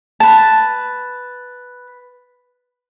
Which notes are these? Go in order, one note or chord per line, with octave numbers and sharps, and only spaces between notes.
B4 A5